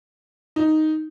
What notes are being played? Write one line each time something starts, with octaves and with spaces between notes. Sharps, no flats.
D#4